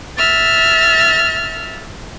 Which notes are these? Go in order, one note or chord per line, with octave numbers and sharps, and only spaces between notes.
E5 F6 A6